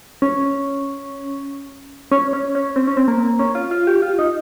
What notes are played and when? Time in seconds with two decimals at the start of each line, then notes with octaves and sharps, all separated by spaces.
0.22 C#4
2.12 C#4
2.33 C#4
2.55 C#4
2.76 C4
2.87 C#4
2.97 C4
3.08 A#3
3.39 C#4
3.55 F4
3.71 F4
3.87 G4
4.02 F4
4.19 D#4